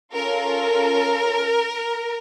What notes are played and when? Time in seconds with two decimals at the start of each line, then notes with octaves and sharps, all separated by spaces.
0.14 C#4 F4 A4 A#4